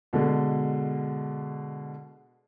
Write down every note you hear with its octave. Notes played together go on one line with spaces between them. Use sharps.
B2 D3 G#3